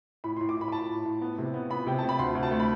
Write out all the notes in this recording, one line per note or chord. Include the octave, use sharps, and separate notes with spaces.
A2 B5
C6
A2
D6
A2 B5
B5
A2 A5
A2
A2
B3
C3
B3
B3 B5
C3 G5
C3 A5
B5
D2 C6
D2
A5
A3
B5